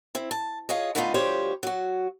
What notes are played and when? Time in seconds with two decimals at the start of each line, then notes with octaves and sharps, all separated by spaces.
0.15 C4 E4
0.31 A5
0.69 F4 G#4 C#5 D#5
0.95 D3 G3 A3 B3 D#4 F4
1.14 D2 F3 G3 G4 C5 C#5
1.63 F#3 F#4